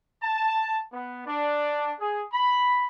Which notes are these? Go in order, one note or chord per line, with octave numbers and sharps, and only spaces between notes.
A5
B3
D4
G#4
B5